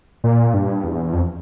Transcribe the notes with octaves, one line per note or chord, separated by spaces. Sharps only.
A#2
G2
E2
F2